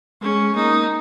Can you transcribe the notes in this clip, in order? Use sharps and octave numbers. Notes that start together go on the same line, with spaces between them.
G#3 C#4
A#3 D#4